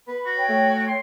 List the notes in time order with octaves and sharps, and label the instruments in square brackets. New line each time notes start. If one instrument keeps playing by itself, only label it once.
[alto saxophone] B4 [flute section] B5
[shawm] F#4
[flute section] C#5 G5
[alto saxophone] A3
[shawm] C6